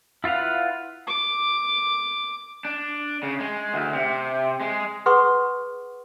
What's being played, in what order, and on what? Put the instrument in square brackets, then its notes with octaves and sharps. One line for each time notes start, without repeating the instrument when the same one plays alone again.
[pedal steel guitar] E4 F4 B4 F5 F#5
[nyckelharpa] D6
[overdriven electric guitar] D4
C#3
G#3
D2
C3
G#3
[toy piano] G#4 B4 F#5 C6 C#6 D#6